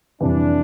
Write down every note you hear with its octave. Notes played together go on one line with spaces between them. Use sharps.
F2 C3 E3 G3 D4